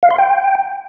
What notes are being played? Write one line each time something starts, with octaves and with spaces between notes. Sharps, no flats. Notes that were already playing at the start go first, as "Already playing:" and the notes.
F5
C6
G5